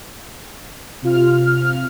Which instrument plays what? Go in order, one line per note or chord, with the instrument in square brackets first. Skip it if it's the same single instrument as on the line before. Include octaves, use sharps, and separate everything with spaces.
[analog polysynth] C3 F4 F6